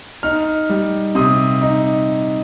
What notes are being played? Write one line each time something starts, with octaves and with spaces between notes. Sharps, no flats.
D#4 F6
G3
C3 D#6
D#4